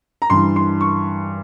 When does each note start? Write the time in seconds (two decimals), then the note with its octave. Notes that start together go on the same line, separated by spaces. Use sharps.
0.22 A#5
0.30 G2 E3 C6
0.56 C6
0.81 C#6